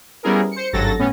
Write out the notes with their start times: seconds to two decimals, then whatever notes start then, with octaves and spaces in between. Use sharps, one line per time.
0.23 G3 B3 C#4 E4 G#4 A#4
0.51 C5 C#7
0.73 G#1 G2 F#3 A4 A6 A#6
0.98 A2 B3 C#4